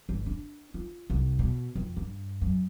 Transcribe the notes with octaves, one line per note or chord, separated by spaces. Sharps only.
G#1
D4
F4
C2
B2
F2
G2
F#2